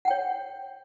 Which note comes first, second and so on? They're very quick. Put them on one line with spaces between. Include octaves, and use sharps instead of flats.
F#5 G5 C#5